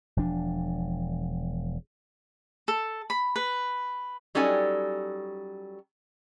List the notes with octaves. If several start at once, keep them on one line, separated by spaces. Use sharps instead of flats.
E1 F3 D4
A4
B5
B4
F#3 G3 C#4 D#4 A4 G#5